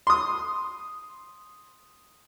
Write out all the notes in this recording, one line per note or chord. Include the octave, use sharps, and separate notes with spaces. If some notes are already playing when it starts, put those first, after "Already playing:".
C6 D#6